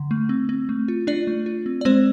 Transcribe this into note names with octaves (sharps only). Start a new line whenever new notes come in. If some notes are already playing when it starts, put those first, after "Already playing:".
Already playing: D3
A3
C4
C4
A3
F4
D4 F4 D5
A3
F4
C4
D5
G#3 C4 C5